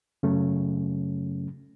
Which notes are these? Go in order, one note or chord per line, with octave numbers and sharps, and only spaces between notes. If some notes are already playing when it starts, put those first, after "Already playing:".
F#2 C#3 F#3 A3 C#4